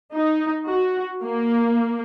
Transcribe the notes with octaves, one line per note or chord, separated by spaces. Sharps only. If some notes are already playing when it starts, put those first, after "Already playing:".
D#4
F#4
A#3